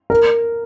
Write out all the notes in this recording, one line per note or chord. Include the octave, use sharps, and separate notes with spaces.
A#4